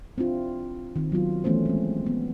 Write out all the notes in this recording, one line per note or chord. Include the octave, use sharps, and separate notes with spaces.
C4 D4 E4 F4
D#3 C4
F#3 B3 F4
E3 A3 B3 C#4 C5
G#3 C4
B3